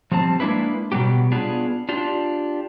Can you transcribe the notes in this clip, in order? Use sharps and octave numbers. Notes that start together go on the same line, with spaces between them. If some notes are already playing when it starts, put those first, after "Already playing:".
F3 G3 C4 A5
G#3 A#3 D4 E4 B4
B2 F#3 G3 B3 G4
B3 D4 F4 G#4
D4 F4 G4